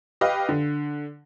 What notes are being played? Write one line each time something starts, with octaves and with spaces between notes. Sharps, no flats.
G4 B4 D#5 F5
D3